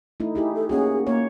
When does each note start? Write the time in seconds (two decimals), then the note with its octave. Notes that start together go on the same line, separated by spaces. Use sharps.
0.20 A3 D#4 E4
0.35 D#4 E4 G4 G#4
0.54 A4
0.69 A#3 C#4 F#4 G#4
1.07 A#3 C#5